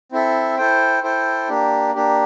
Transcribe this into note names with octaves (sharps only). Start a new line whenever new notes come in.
C4 E4 A4 E5
E4 A4 C5 G5
E4 A4 C5 G5
A#3 D4 G4
A#3 D4 G4